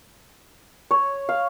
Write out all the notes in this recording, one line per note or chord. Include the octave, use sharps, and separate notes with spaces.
C#5
F5